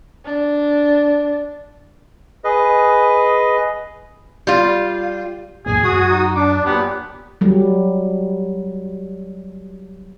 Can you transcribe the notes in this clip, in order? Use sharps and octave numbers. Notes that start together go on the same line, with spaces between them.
D4
G#4 B4 D#5
G3 F4
F2 A2 A#3 G#4 G#5
F#2 F#4 D#6
D#4
D4 D6
A#2 F#3 B3 G4
F#3 G3